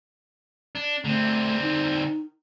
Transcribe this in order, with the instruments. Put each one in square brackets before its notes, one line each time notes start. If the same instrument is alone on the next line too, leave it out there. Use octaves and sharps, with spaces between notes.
[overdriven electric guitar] D4
[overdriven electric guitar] D3 C4 [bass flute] A3
[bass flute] D#4